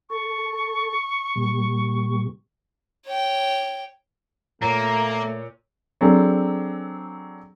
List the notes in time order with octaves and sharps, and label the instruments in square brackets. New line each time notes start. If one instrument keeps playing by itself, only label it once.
[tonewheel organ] A4 [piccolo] C#6
[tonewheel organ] A#2 G3
[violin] C#5 G5
[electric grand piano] A#2 C#5 D#7 [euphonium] A3 [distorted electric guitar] A#3 [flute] A#5
[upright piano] F#3 C4 D4 G#4 A4